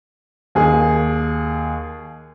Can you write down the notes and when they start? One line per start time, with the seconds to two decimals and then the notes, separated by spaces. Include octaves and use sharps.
0.55 D#2 G#4